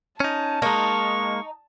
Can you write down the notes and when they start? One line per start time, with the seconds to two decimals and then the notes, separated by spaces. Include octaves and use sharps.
0.20 C#4 D#4 A5
0.62 G#3 A#3 D#4 C#6